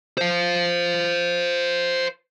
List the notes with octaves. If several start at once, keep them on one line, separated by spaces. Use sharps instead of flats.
C5 F5